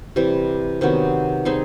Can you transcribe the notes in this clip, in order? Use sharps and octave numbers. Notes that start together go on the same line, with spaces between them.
C3 E3 G3
C3 D#3 F#3 B3
G3 C4 D#4 G#4